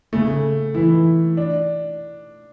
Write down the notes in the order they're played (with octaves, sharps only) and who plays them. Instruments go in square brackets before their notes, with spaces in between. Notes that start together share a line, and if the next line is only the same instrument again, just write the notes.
[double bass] C#3 [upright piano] A3
[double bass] E3 [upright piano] E4
[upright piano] D4